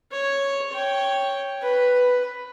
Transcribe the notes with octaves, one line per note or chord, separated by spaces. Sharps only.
C#5
C#5 G5
B4